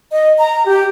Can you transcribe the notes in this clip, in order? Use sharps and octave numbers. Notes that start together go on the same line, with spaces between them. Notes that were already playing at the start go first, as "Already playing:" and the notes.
D#5
A#5
G4